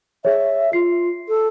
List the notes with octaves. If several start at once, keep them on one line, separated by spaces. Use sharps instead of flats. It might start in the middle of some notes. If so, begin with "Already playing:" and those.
G#4 C#5 E5
F4 C7
A4